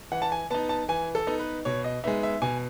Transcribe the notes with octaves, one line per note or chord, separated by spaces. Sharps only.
E3 F#5
A5
G#5
B3 D#4 A5
A5
E3 G#5
A4
B3 D#4
B4
B2 C#5
D#5
G#3 B3 D#4 E5
E5
B2 G#5